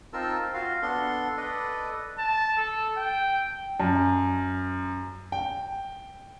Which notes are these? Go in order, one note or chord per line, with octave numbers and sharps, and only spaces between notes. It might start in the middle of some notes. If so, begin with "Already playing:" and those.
C4 D#4 F4 A#4 A5 E6
F4 F#4 F5
B3 D4 A4 C6
A4 B4 D5 D#5
A5
A4
G5
F#2
G5